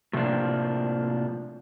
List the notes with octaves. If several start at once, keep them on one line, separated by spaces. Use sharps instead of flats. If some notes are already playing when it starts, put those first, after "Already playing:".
A2 C3 F3 A#3 D4